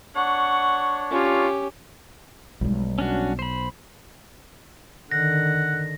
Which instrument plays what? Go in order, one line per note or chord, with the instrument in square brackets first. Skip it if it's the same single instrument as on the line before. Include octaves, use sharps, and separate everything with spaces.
[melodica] D4 C#5 [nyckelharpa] F#5 [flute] C#6
[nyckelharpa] C#4 G4 [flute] F4
[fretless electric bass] B1 [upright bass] G3 G#3
[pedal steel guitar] C#4 D4 F#4
C5 B5
[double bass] D3 D#3 [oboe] F#5 [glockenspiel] A#6